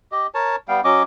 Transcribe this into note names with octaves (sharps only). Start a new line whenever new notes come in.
G4 D#5
A#4 C#5 A5
G3 B3 F5 G5
F#3 C#4 D#5 D6